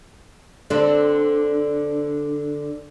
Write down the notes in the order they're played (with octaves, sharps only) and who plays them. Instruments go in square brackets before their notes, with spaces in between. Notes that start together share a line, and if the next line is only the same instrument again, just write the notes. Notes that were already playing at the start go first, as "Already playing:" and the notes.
[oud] D3 C4 D4